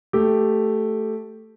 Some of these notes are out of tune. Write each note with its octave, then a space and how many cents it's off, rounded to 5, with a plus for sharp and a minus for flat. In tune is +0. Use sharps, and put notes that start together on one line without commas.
A3 +0 G4 +0